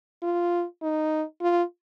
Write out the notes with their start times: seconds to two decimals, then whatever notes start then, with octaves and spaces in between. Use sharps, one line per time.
0.23 F4
0.82 D#4
1.42 F4